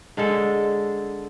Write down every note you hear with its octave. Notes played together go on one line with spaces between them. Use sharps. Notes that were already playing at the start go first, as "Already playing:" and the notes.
D3 G#3 A4